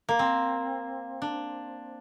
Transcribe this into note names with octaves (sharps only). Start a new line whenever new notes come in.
A#3
C4
D4